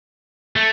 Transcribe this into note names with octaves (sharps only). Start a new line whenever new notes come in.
A3